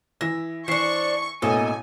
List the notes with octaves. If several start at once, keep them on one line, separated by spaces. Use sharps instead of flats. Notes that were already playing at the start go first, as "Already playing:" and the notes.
E3 E5 A#6
E3 D4 C5 C#6 C7
A1 B2 A3 A#3 A4 D#5 G#5